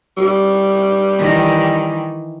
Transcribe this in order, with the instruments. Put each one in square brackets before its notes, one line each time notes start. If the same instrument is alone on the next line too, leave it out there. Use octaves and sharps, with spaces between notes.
[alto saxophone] G3
[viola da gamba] D#3 E3